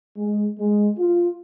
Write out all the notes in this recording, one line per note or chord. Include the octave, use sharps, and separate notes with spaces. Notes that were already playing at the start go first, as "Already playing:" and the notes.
G#3
G#3
F4